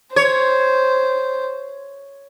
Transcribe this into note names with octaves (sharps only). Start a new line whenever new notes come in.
C5 C#5